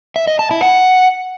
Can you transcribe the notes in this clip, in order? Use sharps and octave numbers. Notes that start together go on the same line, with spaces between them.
E5
D#5
A5
E4
F#5